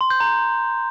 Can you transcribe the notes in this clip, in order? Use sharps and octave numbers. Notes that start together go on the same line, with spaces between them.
C6
G6
A#5